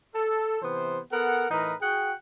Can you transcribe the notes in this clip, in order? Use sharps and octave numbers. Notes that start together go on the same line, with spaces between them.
A4
C3 E3 B3 C5
B3 A4 A#4 F#5
A2 E3 D#4 A#4 B4 A#5
F#4 G#4 F#5 G5